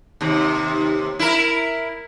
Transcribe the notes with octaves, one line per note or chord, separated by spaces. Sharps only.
D#2 C3
E4 A#4